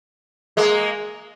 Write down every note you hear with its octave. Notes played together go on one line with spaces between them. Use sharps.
G#3 A#3